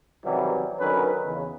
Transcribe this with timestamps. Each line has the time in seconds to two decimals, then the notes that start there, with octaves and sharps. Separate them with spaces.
0.24 E2 C3 D#3 E3 F#3 G3
0.80 D3 D#3 F#3 C#4 B4
1.25 E2 C#3